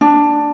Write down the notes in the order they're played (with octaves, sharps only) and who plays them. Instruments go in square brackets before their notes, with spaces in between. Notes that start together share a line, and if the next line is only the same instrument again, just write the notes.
[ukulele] D4